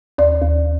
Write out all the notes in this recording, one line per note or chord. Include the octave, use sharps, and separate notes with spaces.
D#2 D5
D#2